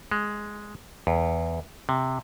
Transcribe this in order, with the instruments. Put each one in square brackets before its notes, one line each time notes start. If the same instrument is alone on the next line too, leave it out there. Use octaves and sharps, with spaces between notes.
[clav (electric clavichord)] G#3
E2
C3